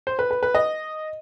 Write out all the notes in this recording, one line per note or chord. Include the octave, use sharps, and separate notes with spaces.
C5
B4
B4
B4
D#5